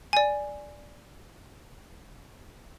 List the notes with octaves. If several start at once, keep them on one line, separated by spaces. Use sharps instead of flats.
D5 G#5